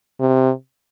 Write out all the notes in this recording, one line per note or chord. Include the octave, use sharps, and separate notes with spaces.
C3